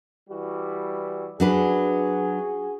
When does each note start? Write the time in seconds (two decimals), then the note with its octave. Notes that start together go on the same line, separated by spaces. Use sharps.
0.30 E3 G3 F#4
1.40 F#3 D4 F#4 G#4 B4